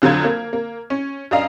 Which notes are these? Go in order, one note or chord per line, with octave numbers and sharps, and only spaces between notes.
F2 D3 F#3 F4 G#6
A#3
A#3
C#4
F#2 D4 D#5 F5